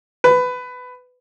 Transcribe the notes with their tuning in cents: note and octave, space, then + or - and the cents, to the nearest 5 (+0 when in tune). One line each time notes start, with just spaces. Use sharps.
B4 +15